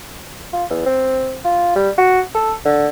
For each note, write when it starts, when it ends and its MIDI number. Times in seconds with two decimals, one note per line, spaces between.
0.53 0.65 65
0.70 0.82 40
0.86 1.38 60
1.45 1.72 65
1.76 1.90 55
1.98 2.20 66
2.34 2.53 69
2.65 2.88 50